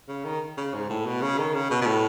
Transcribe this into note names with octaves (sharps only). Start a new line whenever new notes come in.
C#3
D#3
C#3
G#2
A2
B2
C#3
D#3
C#3
B2
B2
A2